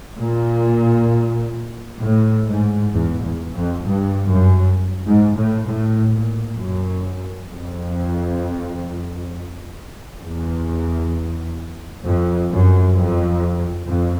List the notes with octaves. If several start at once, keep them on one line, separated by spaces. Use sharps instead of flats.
A#2
A2
G#2
E2
E2
F2
G2
F#2
G#2
A2
A2
A#2
F#2
F2
E2
F2
F#2
F2
F2